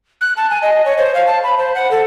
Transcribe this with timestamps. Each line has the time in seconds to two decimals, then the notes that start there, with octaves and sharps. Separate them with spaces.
0.21 F#6
0.37 A5
0.50 G#5
0.62 D#5
0.85 C#5
0.98 C5
1.14 F5
1.27 A5
1.43 B5
1.58 C5
1.75 F#5
1.91 A4